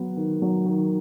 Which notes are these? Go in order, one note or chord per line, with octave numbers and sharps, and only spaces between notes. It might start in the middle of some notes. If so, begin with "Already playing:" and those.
Already playing: F#3 B3
D#3
F#3
D#3